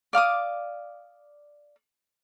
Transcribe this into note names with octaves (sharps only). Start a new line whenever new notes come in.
D5 F5 D6 D#6